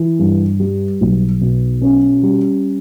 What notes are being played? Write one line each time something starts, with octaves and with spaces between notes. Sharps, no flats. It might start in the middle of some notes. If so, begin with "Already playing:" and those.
Already playing: E3
G2
G3
B1
B2
C#4
G3